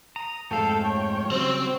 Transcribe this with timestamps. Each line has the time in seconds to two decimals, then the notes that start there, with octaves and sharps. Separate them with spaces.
0.16 A#5 D#6
0.51 F2 G#2 A3 A4 F5 G5
0.86 C#5
1.31 C#3 F#3 G3 C4 C5